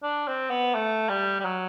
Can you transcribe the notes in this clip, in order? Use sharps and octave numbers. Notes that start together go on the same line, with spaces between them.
D4
C4
B3
A3
G3
G3
F#3